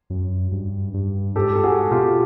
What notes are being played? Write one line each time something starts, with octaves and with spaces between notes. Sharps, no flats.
F#2
G2
G2
G#2 G4 A4
A4
F#4 G#4
B2 F4 G4